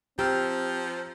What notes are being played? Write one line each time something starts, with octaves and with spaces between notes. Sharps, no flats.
F3 C4 G4 A#5 E6 F6